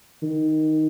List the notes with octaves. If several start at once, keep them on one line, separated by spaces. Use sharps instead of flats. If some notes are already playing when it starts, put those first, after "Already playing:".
D#3